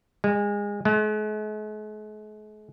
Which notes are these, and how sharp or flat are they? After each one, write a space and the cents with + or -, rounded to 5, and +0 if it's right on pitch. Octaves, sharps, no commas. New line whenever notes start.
G#3 -25
G#3 +45